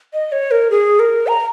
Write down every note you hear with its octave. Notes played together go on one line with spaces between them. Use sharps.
D#5
C#5
A#4
G#4
A#4
A#5